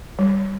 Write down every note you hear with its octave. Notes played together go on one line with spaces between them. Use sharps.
G3